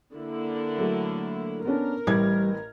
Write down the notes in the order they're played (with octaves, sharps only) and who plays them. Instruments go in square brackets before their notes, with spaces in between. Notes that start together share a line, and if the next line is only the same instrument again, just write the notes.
[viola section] D3 A#3 E4
[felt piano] F#3 A3
[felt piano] B3 C#4 D4 [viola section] A#4
[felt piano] A1 A2 G#6 [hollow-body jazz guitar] G3